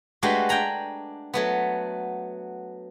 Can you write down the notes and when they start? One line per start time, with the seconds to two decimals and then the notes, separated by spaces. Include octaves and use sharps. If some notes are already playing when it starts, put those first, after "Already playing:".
0.23 G#3 A3 D4 F#4 G4 B4
0.49 D4 G5 G#5 A#5 B5
1.34 F#3 A3 B3